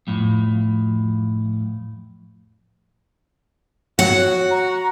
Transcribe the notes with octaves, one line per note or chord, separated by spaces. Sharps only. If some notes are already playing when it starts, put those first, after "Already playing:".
F2 A2
F#4 C#5 F#5
A#5